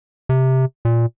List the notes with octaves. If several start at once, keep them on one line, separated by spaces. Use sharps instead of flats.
C3
A#2